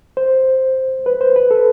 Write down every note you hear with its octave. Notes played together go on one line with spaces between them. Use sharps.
C5
B4
C5
B4
A4